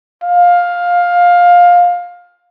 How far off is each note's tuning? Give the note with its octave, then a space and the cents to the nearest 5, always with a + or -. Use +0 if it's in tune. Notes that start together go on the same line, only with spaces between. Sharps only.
F5 +15